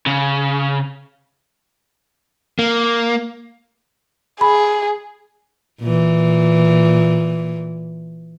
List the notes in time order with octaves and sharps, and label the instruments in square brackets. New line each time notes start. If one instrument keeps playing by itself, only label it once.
[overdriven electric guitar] C#3
[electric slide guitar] A#3
[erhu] G#4 [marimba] B5
[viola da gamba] A#2 E3